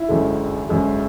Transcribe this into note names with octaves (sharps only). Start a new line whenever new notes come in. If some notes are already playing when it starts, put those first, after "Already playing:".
Already playing: E4
G#1 F#2 D3 G#3
G#1 F#2 D3 G#3